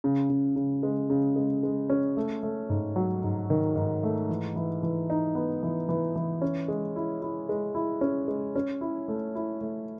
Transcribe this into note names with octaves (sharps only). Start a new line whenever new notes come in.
C#3
C#3
C#3
G#3
C#3
G#3
G#3
C#4
A3
A3
G#2
F#3
G#2
D#3
G#2
A3
E3
E3
E3
D#4
B3
E3
E3
E3
C#4
G#3
E4
E4
G#3
E4
C#4
G#3
C#4
E4
A3
E4
A3